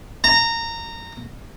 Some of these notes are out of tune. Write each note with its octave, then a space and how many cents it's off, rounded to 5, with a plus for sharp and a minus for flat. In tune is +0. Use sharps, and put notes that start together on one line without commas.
A#5 -20